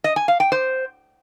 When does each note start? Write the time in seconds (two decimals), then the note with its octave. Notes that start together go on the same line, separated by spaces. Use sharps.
0.04 D#5
0.16 G#5
0.28 F5
0.40 G5
0.52 C5